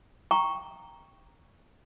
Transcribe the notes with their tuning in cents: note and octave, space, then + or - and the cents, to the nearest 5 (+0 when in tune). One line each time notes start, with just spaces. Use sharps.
G5 +5 A#5 +0 C#6 +0